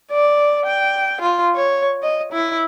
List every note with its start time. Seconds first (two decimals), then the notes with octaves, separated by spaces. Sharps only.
0.11 D5
0.66 G5
1.21 F4
1.55 C#5
2.02 D#5
2.32 E4